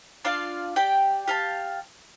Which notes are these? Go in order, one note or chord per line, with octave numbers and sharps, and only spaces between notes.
D4 F4 D5 F5
G4 D5 G5
G4 F5 A5